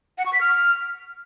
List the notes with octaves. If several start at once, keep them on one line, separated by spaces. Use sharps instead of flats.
F#5
C#6
B6
F6